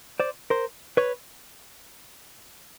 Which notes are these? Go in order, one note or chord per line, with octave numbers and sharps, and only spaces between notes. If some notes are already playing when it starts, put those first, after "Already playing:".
C5 D5
A#4 C5
B4 C#5